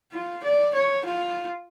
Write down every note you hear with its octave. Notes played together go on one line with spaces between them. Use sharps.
F4
D5
C#5
F4